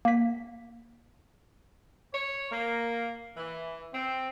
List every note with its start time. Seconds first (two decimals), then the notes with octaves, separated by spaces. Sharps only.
0.05 A#3 B6
2.14 C#5
2.52 A#3
3.37 E3
3.93 C4